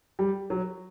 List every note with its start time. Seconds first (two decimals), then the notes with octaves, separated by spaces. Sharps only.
0.19 G3
0.50 F#3